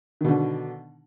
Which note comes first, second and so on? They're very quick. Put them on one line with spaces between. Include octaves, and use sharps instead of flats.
D#3 B2 D3